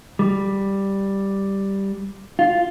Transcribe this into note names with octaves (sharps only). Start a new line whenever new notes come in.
G3
F4